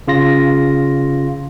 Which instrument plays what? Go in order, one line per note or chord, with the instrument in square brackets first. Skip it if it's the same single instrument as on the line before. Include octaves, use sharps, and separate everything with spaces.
[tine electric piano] C#3 F4 A#6